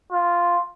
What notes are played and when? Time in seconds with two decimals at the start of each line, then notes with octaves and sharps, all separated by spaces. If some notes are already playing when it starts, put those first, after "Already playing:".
0.12 F4